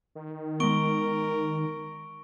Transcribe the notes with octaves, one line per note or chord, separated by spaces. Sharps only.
D#3
G#3 B3 A#4 C#6 D7 G7